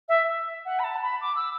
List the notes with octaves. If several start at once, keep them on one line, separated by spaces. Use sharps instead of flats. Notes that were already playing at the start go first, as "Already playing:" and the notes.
E5
F#5
B5
A5
B5
D6
E6